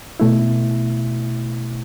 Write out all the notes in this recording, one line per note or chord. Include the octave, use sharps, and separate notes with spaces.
B2 A3 E4